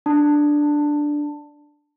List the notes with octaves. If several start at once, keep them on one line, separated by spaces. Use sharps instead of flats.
D4